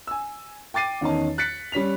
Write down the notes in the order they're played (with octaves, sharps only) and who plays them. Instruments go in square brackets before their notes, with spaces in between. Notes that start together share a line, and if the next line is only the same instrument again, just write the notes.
[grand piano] G#5 E6
G5 D6 A6 C7 D#7
E2 D#3 C#4 D#4 A5
F#6 A6 B6 C#7
G3 C#4 B6 F7